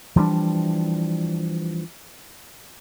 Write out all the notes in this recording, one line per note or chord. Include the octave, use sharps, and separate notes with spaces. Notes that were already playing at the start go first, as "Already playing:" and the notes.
E3 F3 G3 D4